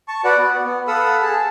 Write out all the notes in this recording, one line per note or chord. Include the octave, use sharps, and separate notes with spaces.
A5 C#6
F#4 B4 D5 F#5
B3
B3
A4 F5 F#5 B5 D#6 E6
G#4 A5